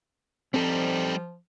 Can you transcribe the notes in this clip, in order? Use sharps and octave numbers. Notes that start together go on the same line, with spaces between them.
F3 G3 C4 D#4 A4